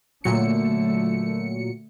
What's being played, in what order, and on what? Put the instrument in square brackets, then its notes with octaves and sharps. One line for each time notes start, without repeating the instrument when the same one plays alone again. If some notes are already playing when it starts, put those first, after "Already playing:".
[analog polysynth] A#2 F#3 C#7 [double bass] D3 A3